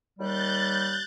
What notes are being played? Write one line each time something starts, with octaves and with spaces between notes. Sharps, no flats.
D#2 G3 F#6 G6 A6